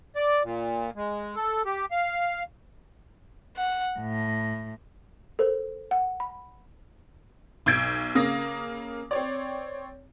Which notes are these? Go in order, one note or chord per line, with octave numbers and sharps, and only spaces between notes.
D5
A#2
G#3
A4
G4
F5
F#5
A2
A4 A#4 C5
F#5
B5
B1 E6 G6 G#6 D7
C#3 A#3 F5 D#6 A#6
C4 C#5 D5